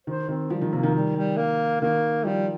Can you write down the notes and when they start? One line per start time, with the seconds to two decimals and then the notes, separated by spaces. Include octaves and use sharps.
0.07 D#3 C5
0.28 D#3 C4
0.50 F3 G3
0.61 D#3
0.73 C3 A#3
0.83 D#3
0.94 G3
1.16 G3
1.37 A#3
1.81 D#3 A#3
2.25 F3 G3